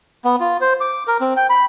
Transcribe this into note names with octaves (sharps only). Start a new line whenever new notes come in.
B3
F4
C5
D6
A#4
C4
G5
B5